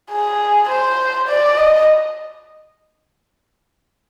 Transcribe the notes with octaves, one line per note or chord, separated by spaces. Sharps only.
G#4
C5
D5
D#5